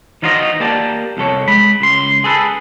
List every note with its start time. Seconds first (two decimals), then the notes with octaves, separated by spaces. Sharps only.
0.22 E3 D#4 F4 F#4 C5 D#5
0.60 A#3 G4 D5 A5
1.17 C2 F2 A4 C#5
1.48 G#3 B5
1.81 C#2 C6
2.24 G#4 A4 B4